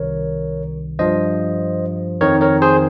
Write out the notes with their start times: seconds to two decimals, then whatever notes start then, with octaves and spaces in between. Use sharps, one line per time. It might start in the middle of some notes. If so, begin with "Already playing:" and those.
Already playing: C2 C3 D#3 A#4 C#5
0.99 G2 F3 C5 D#5
2.21 F2 D#3 A#4 C#5
2.41 A#4 C#5
2.62 G#4 C5